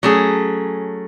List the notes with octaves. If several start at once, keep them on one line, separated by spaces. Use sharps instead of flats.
F#3 A3 C#4 G#4